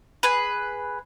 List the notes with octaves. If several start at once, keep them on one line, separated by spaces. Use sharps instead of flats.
G#4 B4